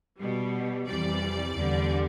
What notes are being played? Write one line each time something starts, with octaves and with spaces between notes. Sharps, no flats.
B2 G3
F2 C3 E3 G3 D5
E2 D3 G3